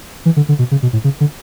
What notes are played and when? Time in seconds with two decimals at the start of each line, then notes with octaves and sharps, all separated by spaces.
0.25 E3
0.36 D3
0.49 D3
0.59 B2
0.71 C#3
0.83 B2
0.93 A2
1.04 C#3
1.20 D3